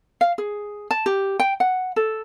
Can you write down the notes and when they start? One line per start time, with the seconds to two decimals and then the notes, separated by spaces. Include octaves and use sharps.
0.21 F5
0.38 G#4
0.91 A5
1.06 G4
1.40 G5
1.60 F#5
1.96 A4